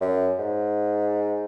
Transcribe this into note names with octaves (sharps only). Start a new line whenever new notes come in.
F#2
G#2